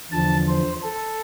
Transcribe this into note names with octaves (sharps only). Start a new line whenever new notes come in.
E2 D3 F3 A5
C5
A4